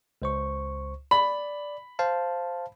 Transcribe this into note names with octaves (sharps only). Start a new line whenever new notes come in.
C#2 C5 C#6
D5 B5
C5 F5 A5